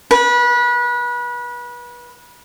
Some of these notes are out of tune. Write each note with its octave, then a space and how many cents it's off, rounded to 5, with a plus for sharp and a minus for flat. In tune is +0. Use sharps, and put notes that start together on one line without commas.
B4 -30